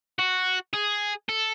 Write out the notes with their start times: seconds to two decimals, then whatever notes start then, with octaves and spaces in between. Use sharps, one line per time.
0.19 F#4
0.73 G#4
1.29 A4